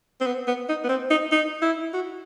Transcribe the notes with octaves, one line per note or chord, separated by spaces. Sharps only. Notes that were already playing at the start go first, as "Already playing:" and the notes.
C4
B3
B3
D#4
B3
C4
D#4
D#4
E4
F#4